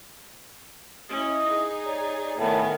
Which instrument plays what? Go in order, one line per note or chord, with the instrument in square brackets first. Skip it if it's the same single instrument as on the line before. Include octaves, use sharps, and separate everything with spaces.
[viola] C#4 [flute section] E4 D#5 D#6
[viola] D#4 G#4
[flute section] C#5 D5 A#5
[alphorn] A2 [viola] D#3 B3 [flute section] G#5 A5 B5